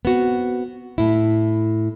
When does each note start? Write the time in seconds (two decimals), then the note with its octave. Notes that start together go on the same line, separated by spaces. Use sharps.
0.05 B3 C4 F#4
0.98 A2 E4